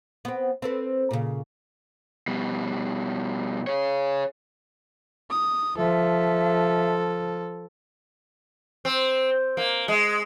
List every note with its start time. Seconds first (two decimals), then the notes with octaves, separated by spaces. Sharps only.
0.25 B3 C4
0.62 C4 A4 B4
1.11 A#2 C#3
2.28 B2 G3
3.67 G#4 C#5
5.30 D#6
5.78 F3 A4 E5
8.85 C4
9.57 A#3
9.88 G#3